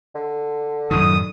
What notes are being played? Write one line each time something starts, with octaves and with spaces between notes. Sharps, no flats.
D3
F#2 A2 D#3 D#6